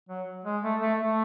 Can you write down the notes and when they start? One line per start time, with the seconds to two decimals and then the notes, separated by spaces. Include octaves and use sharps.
0.09 F#3
0.45 G#3
0.63 A3
0.81 A3
0.99 A3